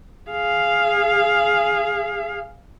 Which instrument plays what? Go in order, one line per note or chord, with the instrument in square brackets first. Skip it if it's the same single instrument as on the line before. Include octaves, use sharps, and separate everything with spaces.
[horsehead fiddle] G#4 F5